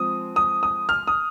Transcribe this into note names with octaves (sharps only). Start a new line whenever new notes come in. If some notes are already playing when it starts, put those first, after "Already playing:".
Already playing: F3 G#3 C4 D#6
D#6
D#6
F6
D#6